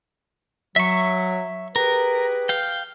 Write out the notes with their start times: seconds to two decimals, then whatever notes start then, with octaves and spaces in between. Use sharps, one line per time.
0.76 F#3 E5 C#6
1.76 G4 G#4 A#4 B4
2.49 F5 G5